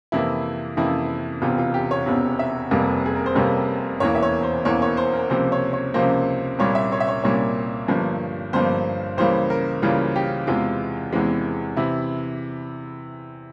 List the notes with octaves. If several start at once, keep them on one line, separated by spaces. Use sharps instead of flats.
F2 C3 E3 A#3 E4
F2 C3 E3 A#3 E4
E1 E2 C3 F4
F4
G4
C#5
E1 E2 C3
E5
F1 F2 C3 G3 A#3
G#4
A#4
C5
F1 F2 C3 G3 A#3 C#5
E1 E2 E3 A#3 C#5
E5
C#5
C5
E1 E2 E3 A#3 C#5
C#5
C5
A#4
C#2 C3 F3 A#3 C5
C#5
C#5
C#2 C3 F3 A#3 C5
C2 A#2 G3 A#3 C#5
E5
C#5
E5
C#5
C2 A#2 G3 A#3 C#5
G1 G2 F3 A#3
G1 G2 F3 A#3 C5
C#2 C#3 E3 G3 A#3 C5
A#4
C#2 C#3 E3 G3 A#3 F4
G4
E2 C3 E3 G#3 F4
E2 C3 E3 G#3
C3 E3 E4